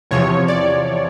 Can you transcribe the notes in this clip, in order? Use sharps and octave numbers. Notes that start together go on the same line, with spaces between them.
E2 C3 F3 C#5
D5